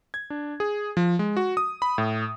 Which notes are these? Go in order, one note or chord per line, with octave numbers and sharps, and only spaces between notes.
G#6
D4
G#4
F3
G#3
F#4
D#6
B5
A2